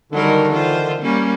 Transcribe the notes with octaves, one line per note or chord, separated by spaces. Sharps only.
D3 D#3 F#3 G3 A#4
E3 F4 C5
G3 A#3 C#4